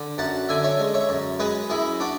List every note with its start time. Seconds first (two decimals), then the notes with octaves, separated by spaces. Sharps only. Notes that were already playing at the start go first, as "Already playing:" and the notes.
Already playing: D3
0.18 F#2 F#5 A5
0.49 D3 E5 G#5
0.64 C#5 E5
0.79 G#3
0.94 C#5 E5
1.09 F#2
1.39 G#3 G#4 B4
1.69 F#2 E4 G#4
2.00 D4 F#4